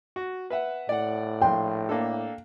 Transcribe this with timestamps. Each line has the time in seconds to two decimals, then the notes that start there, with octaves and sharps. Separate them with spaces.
0.16 F#4
0.50 B4 E5 F#5
0.89 A2 D5 F#5
1.41 A#1 G5 C6
1.89 A#3 D4 A4